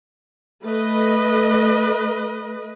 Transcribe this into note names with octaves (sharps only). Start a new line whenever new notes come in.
A3 B4 D#5